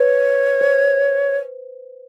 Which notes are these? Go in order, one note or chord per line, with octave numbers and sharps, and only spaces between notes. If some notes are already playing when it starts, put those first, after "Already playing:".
Already playing: B4 C#5
C5